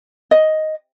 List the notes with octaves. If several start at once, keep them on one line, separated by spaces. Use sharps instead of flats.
D#5